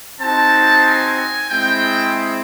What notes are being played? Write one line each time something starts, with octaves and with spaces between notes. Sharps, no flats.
C4 D#4 F#4 A5
G#5
G#3 C4 E4 G5